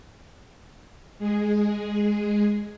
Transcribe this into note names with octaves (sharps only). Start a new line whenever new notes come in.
G#3 G#4